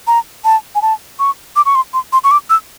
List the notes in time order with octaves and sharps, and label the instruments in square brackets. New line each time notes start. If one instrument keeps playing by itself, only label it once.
[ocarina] A#5
A5
G#5
A5
C#6
D6
C#6
C6
C6
C6
C#6
D6
E6